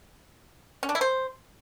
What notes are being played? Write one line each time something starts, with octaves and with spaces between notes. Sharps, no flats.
C#4
D4
E4
C5